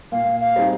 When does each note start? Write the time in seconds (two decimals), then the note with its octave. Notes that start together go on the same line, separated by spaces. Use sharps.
0.12 A#2 F5
0.40 F5
0.56 G3 C4 D#4 G#4